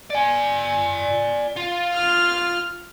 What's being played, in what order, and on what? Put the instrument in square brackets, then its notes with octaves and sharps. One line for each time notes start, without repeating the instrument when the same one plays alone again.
[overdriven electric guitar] D5 G#5
F4
[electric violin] F6